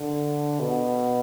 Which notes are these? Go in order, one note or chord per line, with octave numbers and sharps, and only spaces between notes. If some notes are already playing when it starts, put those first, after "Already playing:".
Already playing: D3
B2